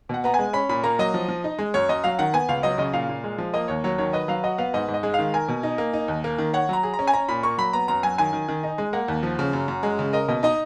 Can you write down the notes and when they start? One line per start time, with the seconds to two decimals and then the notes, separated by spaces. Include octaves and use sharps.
0.09 B2 F#5
0.24 B3 A#5
0.34 G#5
0.39 G#3
0.53 C#4 B5
0.69 A#2 B5
0.83 A#3 A#5
0.99 F#3 D#5
1.14 F3
1.28 F3
1.44 D#4
1.59 G#3
1.74 F#2 C#5
1.89 F#2 D#5
2.04 F#3 F5
2.19 D#3 F#5
2.33 B3 G#5
2.49 C#2 F5
2.63 F#3 D#5
2.78 C#3 D#5
2.93 A#2 F5
3.09 A#2
3.24 G#3
3.38 F3
3.54 A#3 D#5
3.68 D#2 C#5
3.84 F#3 C#5
3.98 D#3 C#5
4.13 B4 D#5
4.28 F#3 F5
4.44 F#4 D#5
4.58 B3 F5
4.74 G#2 D#5
4.88 G#2
4.94 D#5
5.03 G#3
5.14 D#3 F5
5.34 A#4 G#5
5.48 B2
5.63 D#4
5.78 A#3
5.93 D#4
6.08 D#2
6.24 A#3
6.38 D#3
6.53 C#5 F#5
6.69 F#3 A#5
6.83 G#4
6.94 A#5
6.99 C#4
7.07 G#5
7.13 C#4 A#5
7.28 A#2 B5
7.43 A#3 C#6
7.58 F#3 B5
7.73 B3 A#5
7.88 F#2 A#5
8.03 F#3 G#5
8.18 D#3 G#5
8.33 D#3
8.48 D#3
8.63 D#4
8.78 G#3
8.93 A#3 F#5
9.08 D#2
9.23 F3
9.39 C#3
9.53 F#2
9.68 F#2
9.83 G#3
9.99 C#3
10.13 A#4 D#5
10.28 B2 D#5
10.43 D#4 D#5